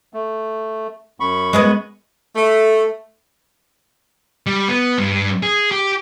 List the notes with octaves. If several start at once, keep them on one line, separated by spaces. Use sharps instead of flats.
A3
F#2 B5 C#6
G#3 B3 D#5
A3
G3
B3
G2
G#4
G4